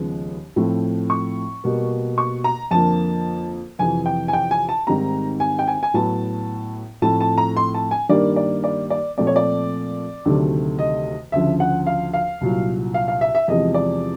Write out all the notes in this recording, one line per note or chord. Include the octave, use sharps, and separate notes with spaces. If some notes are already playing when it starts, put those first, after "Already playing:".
Already playing: D#2 C#3 F3 G#3 B3
A2 F3 A3 C4
C#6
B2 G3 A#3
C#6
A#5
F2 D3 F3 A#3 A5
F2 C3 E3 G#5
G5
G#5
G5
G#5
A5
G#2 D#3 G3 C4 A#5
G#5
G5
G#5
G#5
A2 F#3 B3 A5
A2 F3 A3 C4 A5
A5
A#5
C6
A5
G#5
G2 D#3 G3 A#3 D5
D5
D5
D5
A#2 F3 A3 C4 D5
C#5
D5
D2 C3 D#3 F#3 A3
D#5
D2 C#3 F3 E5
F#5
F5
F5
C2 A#2 F#3
F5
F5
E5
E5
E2 C3 F3 G#3 C4 D#5
D5